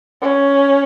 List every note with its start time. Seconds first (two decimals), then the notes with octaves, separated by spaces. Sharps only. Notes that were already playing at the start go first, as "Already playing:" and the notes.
0.22 C#4